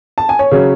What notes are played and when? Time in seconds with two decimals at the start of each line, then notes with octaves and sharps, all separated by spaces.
0.18 A5
0.29 G#5
0.39 C#5
0.52 C#3 F#3 C#4